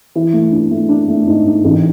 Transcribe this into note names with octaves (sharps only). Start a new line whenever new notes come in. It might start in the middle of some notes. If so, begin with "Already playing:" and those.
E3
A3
D4
A3
D4
A3
G#2
D4
A1